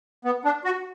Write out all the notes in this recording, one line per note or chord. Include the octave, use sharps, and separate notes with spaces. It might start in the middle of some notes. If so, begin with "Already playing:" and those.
B3
D4
F#4